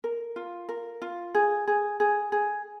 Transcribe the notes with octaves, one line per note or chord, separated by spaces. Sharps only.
A#4
F4
A#4
F4
G#4
G#4
G#4
G#4